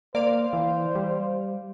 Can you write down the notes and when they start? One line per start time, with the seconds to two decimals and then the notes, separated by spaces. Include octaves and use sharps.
0.15 A#3 C5 D5 F5
0.53 E3
0.95 G3